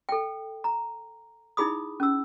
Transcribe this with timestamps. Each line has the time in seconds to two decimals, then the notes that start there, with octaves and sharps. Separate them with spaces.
0.09 A4 G5
0.64 A#5
1.57 D#4 E4 G#4 B5 D#6
2.00 C#4 E6